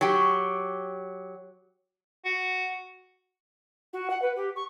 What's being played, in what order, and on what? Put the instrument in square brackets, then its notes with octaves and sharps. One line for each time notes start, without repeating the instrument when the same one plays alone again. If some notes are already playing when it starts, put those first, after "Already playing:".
[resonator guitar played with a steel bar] F#3 G4
[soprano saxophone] F#4
[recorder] F#4
F#5
B4
G4
C#6